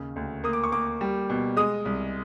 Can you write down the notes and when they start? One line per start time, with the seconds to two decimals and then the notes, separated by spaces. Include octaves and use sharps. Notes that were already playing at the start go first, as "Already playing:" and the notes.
Already playing: D#2 C#3
0.16 D2
0.44 A#3 D#6
0.53 D6
0.63 C#6
0.72 A#3 D6
1.01 G3
1.30 B2
1.57 G#3 D#6
1.85 C2